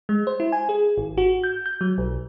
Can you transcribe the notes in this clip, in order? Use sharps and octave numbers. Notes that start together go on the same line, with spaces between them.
G#3
C5
E4
G#5
G#4
G#1
F#4
G6
G6
F#3
B1